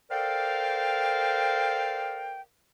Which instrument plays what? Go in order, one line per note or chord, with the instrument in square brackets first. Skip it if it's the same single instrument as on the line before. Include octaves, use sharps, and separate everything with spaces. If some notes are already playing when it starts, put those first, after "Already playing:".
[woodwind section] A4 A#4 C5 D5 F5 G5